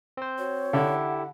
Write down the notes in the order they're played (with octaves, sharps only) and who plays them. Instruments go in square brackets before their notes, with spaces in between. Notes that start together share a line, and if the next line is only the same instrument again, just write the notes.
[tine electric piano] C4 C5
[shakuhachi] F#4 [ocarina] C#5
[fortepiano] D3 [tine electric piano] E4 G4 A4 [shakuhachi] F#5